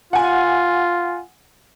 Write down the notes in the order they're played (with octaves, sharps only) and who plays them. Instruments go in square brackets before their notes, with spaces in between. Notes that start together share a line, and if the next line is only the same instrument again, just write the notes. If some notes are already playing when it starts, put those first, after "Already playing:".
[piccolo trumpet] F4 [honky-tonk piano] F#5 G#5